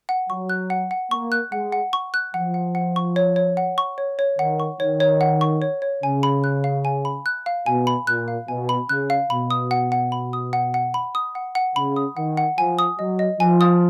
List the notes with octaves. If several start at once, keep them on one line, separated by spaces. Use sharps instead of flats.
F#5
F#3 C#6
F#6
F#5
F#5
A#3 C#6
F#6
G#3 F#5
F#5
C#6
F#6
F3 F#5
F#5
F#5
C#6
C#5
C#5
F#5
C#6
C#5
C#5
D#3 F#5
C#6
D#3 C#5
C#5
F#5
C#6
C#5
C#5
C#3 G#5
B5
F#6
F5
G#5
B5
F#6
F5
B2 G#5
B5
A#2 F#6
F5
B2 G#5
B5
C#3 F#6
F5
B2 B5
D#6
F#5
F#5
B5
D#6
F#5
F#5
B5
D#6
F#5
F#5
C#3 B5
D#6
D#3 F#5
F#5
F3 G#5
D#6
F#3 D#5
D#5
F3 G#5
D#6